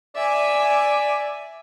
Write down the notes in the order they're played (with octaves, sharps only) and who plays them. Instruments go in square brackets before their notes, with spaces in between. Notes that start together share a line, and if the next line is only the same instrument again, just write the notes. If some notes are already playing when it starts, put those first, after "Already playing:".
[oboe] D5 [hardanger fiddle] E5 G#5